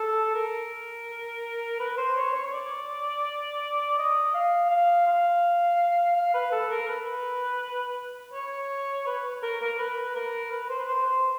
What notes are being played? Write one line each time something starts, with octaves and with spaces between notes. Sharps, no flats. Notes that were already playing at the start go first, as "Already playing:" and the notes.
Already playing: A4
A#4
B4
C5
C#5
C#5
D5
D#5
F5
F5
F5
F5
B4
A4
A#4
B4
C#5
B4
A#4
A#4
B4
A#4
B4
C5
B4
C5
C5